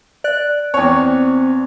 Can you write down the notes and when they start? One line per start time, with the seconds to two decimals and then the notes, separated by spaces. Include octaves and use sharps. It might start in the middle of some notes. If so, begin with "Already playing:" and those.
0.24 D5 F#6
0.74 E2 C4 C#5